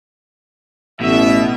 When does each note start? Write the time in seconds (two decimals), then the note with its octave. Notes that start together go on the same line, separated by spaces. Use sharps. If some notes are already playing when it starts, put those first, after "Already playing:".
1.00 A1 B2 E5